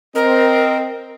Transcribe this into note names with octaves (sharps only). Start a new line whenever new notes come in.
C4 A#4 D#5